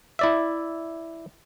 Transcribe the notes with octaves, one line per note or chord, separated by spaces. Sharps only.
E4 D5 E5